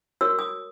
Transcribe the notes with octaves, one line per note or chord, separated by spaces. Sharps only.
F#4 A#4 C#5 E6
D#6